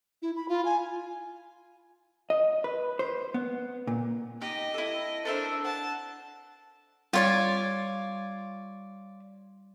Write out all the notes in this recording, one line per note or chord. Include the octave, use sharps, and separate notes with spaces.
E4
B5
F4
G#5
D#5
B4
C5
B3
A#2
D#4 G4 D#5
E4 A4
D4 A4 A#4 C5 E5
F#5 A5
G3 F4 C#5 D5